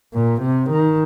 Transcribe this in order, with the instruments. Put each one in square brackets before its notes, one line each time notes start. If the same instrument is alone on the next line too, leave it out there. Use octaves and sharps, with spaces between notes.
[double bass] A#2
C3
D#3